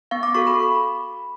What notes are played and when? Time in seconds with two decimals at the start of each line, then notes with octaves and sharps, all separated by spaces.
0.11 B3 F5
0.23 D6
0.35 F#4 A4 C#6
0.47 B5